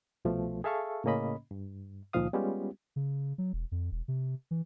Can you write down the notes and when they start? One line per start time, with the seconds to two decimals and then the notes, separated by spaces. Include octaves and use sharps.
0.25 C2 B2 F3 A3
0.64 G#4 A4 E5 F5 A5 C#6
1.04 A2 C#3 A#3 C#4 D#5 B5
1.51 G2
2.13 C#2 A#2 D#3 F3 F5 D#6
2.33 G3 G#3 B3 C#4 F4 G4
2.96 C#3
3.38 F#3
3.53 E1
3.72 F2
3.92 E1
4.08 C3
4.51 E3